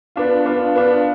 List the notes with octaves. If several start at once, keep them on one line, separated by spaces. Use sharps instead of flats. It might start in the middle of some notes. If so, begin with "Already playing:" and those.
B3 D4 F4
B3 D4 F4
B3 D4 F4